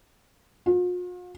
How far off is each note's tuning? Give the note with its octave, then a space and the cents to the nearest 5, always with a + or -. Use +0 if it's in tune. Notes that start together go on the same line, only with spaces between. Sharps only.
F4 +45